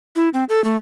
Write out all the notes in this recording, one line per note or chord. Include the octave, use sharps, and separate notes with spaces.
E4
C4
A4
A3